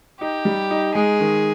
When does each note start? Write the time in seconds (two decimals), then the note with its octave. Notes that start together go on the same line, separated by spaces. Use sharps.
0.21 D#4 G4
0.45 G3
0.71 D#4
0.95 G#3 G#4
1.20 D#3